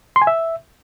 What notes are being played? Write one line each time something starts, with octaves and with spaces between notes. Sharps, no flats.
C6
G#5
E5